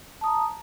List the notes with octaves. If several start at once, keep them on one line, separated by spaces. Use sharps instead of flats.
A5 A#5 D#6